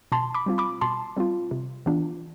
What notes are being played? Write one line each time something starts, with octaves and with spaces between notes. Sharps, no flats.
B2 A5 C6
B5 D6
G3 C4 F4
B5 D6
B2 A5 C6
G3 C4 F4
C3
E3 B3 D4 F4